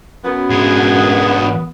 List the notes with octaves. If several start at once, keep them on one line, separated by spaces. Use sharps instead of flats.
F#2 B3
G#2 D3 G#4